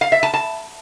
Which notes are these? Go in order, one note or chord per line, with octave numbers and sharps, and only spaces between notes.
F5
E5
A5
A5